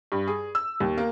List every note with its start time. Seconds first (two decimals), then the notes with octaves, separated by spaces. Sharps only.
0.12 G2
0.27 G#4
0.55 E6
0.80 D#2
0.98 A#3